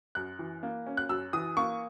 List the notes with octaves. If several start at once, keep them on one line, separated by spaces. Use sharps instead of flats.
F#2 F#6
E3
A#3
C#4
F#6
F#2 E6
E3 D#6
A#3 C#6